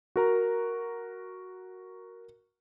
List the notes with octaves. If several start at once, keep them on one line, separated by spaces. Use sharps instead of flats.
F#4 A#4 A#5